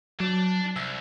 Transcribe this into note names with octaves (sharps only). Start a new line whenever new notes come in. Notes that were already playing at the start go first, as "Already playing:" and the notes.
F#3 D4
C2 E6